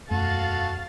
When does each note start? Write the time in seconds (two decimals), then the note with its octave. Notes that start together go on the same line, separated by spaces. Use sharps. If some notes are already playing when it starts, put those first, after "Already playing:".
0.10 E1 F#2 A3 F#4 A4 F5 A6